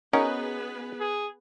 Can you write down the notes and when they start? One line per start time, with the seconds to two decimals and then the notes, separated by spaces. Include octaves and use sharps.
0.13 B3 C#4 D#4 F#4 G#4 A#4 B4
1.00 G#4